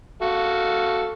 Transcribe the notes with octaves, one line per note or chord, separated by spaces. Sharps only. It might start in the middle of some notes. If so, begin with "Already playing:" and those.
F#4 A4 F5